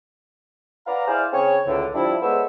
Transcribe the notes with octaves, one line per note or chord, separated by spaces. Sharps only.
B4 D5 F5 F#5 A#5
E4 G#4 C5 D5 F5
C#3 C4 G#4 C#5
C#2 A2 D3
F3 G3 D4 E4
G#3 B3 A4 C5 C#5 E5